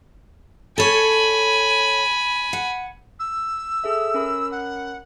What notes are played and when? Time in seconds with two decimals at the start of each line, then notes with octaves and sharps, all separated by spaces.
0.78 A4 C#5 G#5 B5
2.53 F#5
3.20 E6
3.84 G#4 A4 E5
4.14 C#4 A#4 B5
4.52 F#5